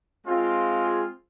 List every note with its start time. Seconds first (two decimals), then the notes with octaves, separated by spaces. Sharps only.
0.24 G#3 C4 F4
0.82 G#4